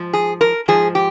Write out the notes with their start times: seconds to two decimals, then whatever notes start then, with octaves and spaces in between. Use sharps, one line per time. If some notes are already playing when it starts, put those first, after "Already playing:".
Already playing: G#2 F3
0.13 G#4
0.41 A#4
0.68 G#2 F3 G#4
0.95 G4